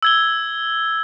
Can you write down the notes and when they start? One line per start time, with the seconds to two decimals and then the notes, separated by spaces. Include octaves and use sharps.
0.03 E6 G#6 G7